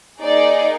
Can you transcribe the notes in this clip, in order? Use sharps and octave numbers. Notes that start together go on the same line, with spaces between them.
A#3 D#4 G#4 D5